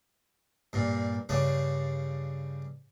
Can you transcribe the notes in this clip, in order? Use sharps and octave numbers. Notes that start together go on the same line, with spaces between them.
G2 A#2
G2 C#3 D4